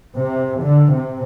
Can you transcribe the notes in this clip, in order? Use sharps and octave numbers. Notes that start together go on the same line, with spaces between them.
C3
D3
C3